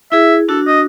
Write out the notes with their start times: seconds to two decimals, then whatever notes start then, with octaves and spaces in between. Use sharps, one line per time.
0.12 E4 G#4 E5
0.49 D4 F#4 A4
0.67 D#5